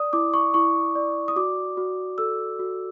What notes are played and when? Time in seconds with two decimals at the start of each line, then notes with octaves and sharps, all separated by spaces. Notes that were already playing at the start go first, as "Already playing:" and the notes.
Already playing: D5 D#6
0.13 E4 D6
0.34 C#6
0.54 E4 C#6
0.95 D5
1.28 D#6
1.36 F#4 D6
1.77 F#4
2.18 A4 E6
2.59 F#4